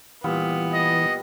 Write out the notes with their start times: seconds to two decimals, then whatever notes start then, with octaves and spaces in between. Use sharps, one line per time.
0.24 A#2 E3 G3 B3
0.74 D#5